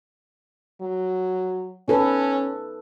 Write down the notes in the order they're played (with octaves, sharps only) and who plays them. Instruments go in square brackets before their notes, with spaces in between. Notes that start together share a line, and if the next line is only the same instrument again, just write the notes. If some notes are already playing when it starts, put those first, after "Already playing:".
[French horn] F#3
[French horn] C#4 [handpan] D#4 A4 B4